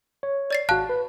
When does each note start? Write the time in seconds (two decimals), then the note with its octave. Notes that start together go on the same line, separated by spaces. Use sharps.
0.23 C#5
0.51 D5 A6 C7
0.69 G#1 F#4 F5 A5 F#6
0.89 B4